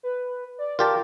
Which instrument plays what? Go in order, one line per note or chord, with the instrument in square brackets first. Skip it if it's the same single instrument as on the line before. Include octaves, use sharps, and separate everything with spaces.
[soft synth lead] B4
D5
[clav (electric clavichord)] F4 G4 A5 [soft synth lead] A#4